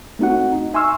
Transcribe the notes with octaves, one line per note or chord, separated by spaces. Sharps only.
A3 C4 D#4 F#4 F#5
D#4
E5 G#5 C6 C#6 E6 F6